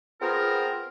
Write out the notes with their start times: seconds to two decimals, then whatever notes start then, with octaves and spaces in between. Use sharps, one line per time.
0.21 B3 C4 F4 G#4 A#4